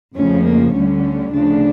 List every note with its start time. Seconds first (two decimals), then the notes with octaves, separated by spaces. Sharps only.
0.17 F2 C#3 F3 A3 C#4
0.46 A#3
0.74 D2 D3 G3 C#4
1.32 D2 C#3 F3 A3 D4